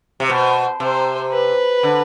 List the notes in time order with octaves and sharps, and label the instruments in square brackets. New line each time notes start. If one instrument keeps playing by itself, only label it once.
[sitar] C3
[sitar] B2 [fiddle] C5
[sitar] C3 [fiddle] C5
[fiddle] B4
[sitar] D3